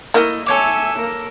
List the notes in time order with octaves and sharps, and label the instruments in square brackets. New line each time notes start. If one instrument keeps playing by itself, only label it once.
[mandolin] A3 D#5 A#5 [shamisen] A#3 [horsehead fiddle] E4
[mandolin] A4 C#5 D6 [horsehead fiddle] E5 G#5
[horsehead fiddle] A#3 A#4